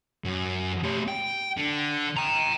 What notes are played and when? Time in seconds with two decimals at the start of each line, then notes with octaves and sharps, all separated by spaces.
0.24 F#2
0.84 A3 G4
1.08 G5
1.57 D3
2.17 G5 A#5